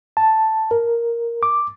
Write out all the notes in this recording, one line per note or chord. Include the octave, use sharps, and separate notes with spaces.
A5
A#4
D6